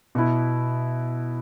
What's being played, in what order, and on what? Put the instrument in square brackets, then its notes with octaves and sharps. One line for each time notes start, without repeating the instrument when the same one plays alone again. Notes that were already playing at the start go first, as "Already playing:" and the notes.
[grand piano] B2 B3 E4